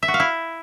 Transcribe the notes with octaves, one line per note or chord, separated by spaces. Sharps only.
E5
F#4
F5
E4